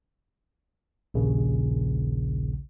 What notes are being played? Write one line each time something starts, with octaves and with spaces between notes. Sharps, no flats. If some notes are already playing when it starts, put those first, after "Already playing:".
A#1 D#2 C#3